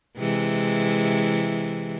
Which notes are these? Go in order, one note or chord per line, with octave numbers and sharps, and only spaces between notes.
C3 E3 G#3